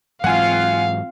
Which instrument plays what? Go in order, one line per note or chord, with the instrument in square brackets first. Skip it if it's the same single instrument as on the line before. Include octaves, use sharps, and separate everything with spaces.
[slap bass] G#2 E3 F#3 [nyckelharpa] C4 F4 [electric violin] F5 [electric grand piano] F#5 G#5